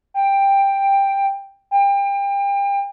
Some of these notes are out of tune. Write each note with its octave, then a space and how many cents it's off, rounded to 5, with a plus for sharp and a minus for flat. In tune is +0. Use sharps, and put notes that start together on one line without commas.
G5 +10
G5 +30